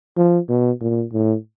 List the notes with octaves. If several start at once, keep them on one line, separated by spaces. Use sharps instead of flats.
F3
B2
A#2
A2